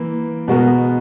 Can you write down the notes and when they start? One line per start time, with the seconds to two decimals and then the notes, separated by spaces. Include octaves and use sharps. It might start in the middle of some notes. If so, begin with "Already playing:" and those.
Already playing: E3 A#3
0.48 B2 G#3 B3 F#4 A#4